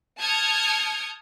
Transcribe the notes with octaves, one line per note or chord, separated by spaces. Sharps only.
A5 D#6 F6 G6 G#6 C#7